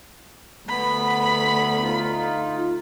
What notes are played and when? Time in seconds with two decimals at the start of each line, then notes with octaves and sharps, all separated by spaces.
0.69 D2 B3 B5
1.81 D#4 F4